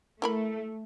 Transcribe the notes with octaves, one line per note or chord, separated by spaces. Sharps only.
A3 E4 A#4 B5